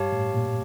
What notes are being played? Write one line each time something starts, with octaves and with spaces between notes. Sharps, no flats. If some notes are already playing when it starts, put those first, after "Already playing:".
Already playing: G2 G4 C#5 F5 A5
A2
A#2